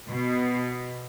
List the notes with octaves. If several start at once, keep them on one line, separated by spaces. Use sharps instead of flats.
B2